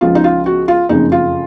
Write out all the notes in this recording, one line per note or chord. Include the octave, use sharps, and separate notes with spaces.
C#2 C#3 F3 F4
D#4
F4
F#4
F4
F#1 F2 C#3 F3 D#4
F4